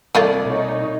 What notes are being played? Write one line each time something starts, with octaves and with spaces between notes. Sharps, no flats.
C2 A3 A#3 F4 D5
B2 D#4 C#5